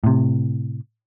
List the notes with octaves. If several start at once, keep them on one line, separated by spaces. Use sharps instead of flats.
A2 C3